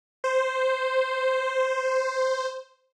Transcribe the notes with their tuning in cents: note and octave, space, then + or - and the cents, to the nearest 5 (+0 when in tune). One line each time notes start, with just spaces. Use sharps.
C5 -5